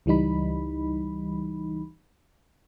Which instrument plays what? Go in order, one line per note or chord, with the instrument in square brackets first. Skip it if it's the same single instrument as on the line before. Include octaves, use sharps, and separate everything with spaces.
[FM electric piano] C#2 E3 G3 D#4 B5